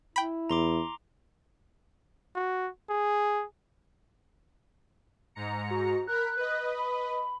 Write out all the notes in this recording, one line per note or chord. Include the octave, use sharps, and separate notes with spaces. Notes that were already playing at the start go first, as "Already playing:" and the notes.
E4 G5 B5
E2 A#5 C6 D6
F#4
G#4
G#2 A#5 C#7
F#4
A#4 B5 F#6
B4 D#5
B5